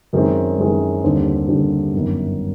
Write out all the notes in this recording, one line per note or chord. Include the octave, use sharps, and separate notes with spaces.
F#2 D#3 G#3 C4
F#2 D#3 G#3 C4
D#2 D3 G3 C4
D#2 D3 G3 C4
G1 F#2 D#3